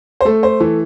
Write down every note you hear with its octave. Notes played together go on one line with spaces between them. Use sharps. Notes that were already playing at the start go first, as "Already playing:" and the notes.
C5
A3 A4
C5
E3 A4